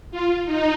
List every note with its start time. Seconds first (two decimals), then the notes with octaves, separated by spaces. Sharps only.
0.11 F4
0.45 D#4